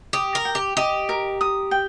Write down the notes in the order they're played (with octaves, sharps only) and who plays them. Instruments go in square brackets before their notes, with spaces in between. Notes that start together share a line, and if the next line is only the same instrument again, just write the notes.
[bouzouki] G4 [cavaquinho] D#6
[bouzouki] A#4
[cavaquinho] G5
[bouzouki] G4
[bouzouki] G4 [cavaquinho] D#5
[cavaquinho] A#4
D#6
G5